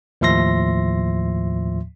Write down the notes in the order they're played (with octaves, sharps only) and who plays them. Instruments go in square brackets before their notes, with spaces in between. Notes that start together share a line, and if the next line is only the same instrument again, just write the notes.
[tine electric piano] D#2 A2 F3 E5 C6 A#6